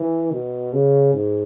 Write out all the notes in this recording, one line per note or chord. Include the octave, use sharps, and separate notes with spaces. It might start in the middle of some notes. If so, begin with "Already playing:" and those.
Already playing: E3
B2
C#3
G#2